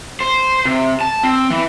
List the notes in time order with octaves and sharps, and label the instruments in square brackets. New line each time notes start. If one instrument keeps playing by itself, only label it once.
[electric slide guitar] C5
C3
A5
C4
E3